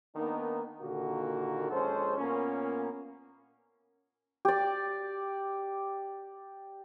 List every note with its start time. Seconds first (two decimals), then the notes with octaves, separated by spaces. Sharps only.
0.15 D#3 A#3 B3 D4 D#4
0.81 A#2 D3 D#3 A#3 F#4 G4
1.71 A#1 G#3 C#4 A4 C5
2.18 A#2 A#3 B3 C#4
4.45 G4 D5